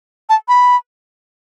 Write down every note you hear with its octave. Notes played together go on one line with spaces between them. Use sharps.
A5
B5